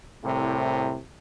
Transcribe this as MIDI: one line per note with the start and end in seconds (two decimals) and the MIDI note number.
0.24 0.98 36
0.24 0.98 45
0.24 0.98 48